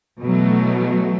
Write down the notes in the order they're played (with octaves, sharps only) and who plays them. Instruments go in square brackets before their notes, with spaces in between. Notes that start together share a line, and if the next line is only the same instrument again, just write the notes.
[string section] B2 E3 F#3 A3